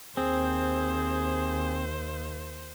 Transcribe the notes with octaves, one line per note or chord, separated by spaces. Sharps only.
D#2 C4 G#4 C5